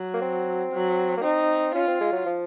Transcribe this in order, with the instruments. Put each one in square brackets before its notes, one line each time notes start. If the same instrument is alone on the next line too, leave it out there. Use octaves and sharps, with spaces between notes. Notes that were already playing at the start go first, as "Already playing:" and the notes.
Already playing: [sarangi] F#3
[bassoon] A#3
C4
[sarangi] F#3
[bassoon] A#3
[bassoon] C4 [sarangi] D#4
[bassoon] C#4 [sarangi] F4
[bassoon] C4
G#3
F#3
F3